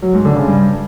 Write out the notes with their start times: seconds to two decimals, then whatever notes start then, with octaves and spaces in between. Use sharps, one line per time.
0.02 F#3
0.14 G#2
0.25 D3
0.36 C#3
0.47 G2